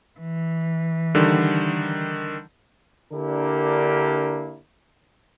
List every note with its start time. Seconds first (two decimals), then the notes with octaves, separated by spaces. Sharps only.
0.19 E3
1.15 D3 D#3 G3
3.12 D3 A#3 D4 E4 G4 A#4